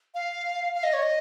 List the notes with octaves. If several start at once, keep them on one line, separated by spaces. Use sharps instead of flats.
F5
F5
D#5
C#5
D#5